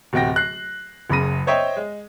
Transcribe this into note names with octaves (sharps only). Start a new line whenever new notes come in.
D1 C3 F#4 G5 A#6
F#6 C7
F#1 F#2 C#3 B5 A#6 D#7
C5 C#5 D#5 E5 G5
G#3